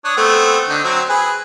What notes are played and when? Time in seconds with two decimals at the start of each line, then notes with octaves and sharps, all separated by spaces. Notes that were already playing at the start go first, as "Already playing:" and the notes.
0.05 D4 C#5 D#6
0.17 A3 B3 C4
0.69 D3 D#4
0.84 F#3 C4
1.10 G#4 B4